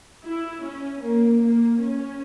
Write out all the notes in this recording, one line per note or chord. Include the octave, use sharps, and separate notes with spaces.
E4
C#4
A#3
A#3
C#4